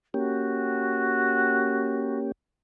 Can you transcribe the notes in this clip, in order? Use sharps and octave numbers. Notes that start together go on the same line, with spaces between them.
A#3 C#4 F#4 G4